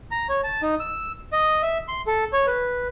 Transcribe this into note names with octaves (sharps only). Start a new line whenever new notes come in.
A#5
C#5
A5
D#4
E6
D#5
E5
C6
A4
C#5
B4